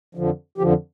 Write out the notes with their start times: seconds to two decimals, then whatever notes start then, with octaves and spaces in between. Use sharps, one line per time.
0.15 F2 D3 F3
0.58 F2 D3 F3 G4